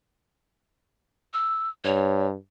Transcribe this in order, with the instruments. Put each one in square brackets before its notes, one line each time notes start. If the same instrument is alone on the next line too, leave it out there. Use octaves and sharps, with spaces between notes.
[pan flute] E6
[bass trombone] G2 [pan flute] C#5